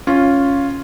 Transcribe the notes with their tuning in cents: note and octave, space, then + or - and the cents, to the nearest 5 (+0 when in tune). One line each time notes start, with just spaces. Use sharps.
C#4 +0 F4 +0